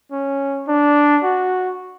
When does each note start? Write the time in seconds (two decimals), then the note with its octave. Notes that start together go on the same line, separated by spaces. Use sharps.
0.12 C#4
0.68 D4
1.23 F#4